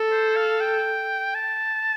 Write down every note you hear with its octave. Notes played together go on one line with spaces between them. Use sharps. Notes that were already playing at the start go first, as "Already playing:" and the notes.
Already playing: A4
C5
F5
G5
A5